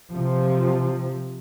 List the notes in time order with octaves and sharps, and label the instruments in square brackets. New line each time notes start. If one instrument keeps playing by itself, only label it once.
[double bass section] C3 F3